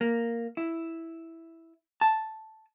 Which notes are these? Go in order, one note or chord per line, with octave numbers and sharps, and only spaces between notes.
A#3
E4
A5